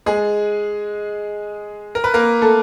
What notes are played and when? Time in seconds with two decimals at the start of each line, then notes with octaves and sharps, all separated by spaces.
0.06 G#3 G#4
1.95 A#4
2.04 B4
2.14 A#3 A#4
2.42 A3 A4